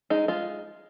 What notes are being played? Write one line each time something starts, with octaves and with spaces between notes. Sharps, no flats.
G#3 D#4
G#3 F4